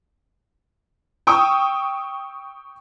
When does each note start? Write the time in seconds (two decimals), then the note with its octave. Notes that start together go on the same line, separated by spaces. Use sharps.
1.27 G5 C#6 D#6 E6